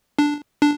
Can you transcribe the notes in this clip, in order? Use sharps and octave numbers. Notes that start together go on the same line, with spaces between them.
D4
D4